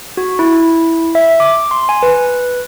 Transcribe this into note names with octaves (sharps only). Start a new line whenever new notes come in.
F#4
E4
E5
D6
C6
G#5
B4